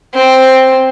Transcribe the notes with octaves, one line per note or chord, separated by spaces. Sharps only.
C4